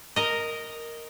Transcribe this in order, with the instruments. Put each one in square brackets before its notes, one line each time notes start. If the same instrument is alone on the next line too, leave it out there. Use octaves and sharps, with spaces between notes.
[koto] A#4 D#5